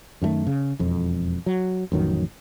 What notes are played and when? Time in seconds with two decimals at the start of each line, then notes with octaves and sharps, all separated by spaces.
0.22 F#2 D#3 F3 A3
0.47 C#3
0.79 E1 F2
1.46 F#3
1.92 A1 F2 D#3 F#3